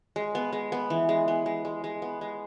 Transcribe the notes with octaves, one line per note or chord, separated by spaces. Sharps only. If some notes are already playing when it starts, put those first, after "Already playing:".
G#3
B3
G#3
B3
E3
G#3
B3
G#3
G#3
G#3
B3
G#3